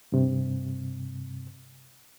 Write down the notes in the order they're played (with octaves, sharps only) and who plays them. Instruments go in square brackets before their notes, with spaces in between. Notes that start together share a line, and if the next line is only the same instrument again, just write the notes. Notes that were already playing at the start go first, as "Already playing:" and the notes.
[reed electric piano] G2 C3